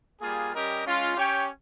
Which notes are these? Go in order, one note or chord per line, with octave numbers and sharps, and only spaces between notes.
G3 A#3 F4 G#4
G3 C#4 G4 A#4 D#5
G#3 C#4 F4
C#4 G4 C#5 G5